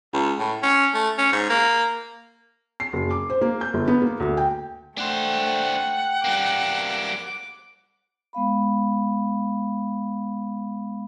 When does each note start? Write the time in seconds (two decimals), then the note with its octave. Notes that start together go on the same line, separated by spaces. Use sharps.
0.13 C#2
0.39 A2
0.62 C#4
0.94 A3
1.18 C#4
1.32 G#2
1.49 A#3
2.80 C7
2.93 F#1
3.11 D6
3.30 C5
3.41 A#3
3.61 G6
3.74 G1
3.88 B3
4.02 A#3
4.20 D2
4.37 G5
4.98 A3 D4 C5 F#5 G5
6.24 G3 A#3 D6
8.33 G#3 B3 F5 B5